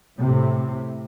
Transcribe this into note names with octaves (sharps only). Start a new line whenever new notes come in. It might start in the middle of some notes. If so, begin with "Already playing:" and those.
A2 C3